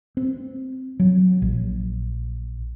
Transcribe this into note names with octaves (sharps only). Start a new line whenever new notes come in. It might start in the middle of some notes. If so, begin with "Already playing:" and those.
C4
F#3
A#1